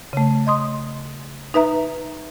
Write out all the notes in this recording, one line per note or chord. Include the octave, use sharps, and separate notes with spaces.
C#3 A3
D#5 C6 D#6
D#4 B4 E5 A#5